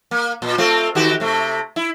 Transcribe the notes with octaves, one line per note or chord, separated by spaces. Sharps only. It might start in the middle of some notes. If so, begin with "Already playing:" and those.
A#3
A#2
A3 C4 F4
D#3 F#4 G4
C3 A3
E4